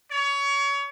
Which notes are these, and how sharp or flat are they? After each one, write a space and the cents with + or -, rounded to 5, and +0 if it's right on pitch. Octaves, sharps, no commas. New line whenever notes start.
C#5 +25